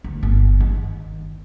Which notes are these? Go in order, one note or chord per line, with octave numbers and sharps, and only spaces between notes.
D2
G1
D#3